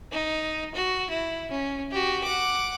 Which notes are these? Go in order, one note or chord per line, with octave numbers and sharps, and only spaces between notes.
D#4
F#4
E4
C#4
F#4 G4
F#5 D6